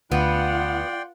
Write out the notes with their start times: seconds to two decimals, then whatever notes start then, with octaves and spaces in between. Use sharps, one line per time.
0.12 D2 B3 F4 D5 F#5 G5 C6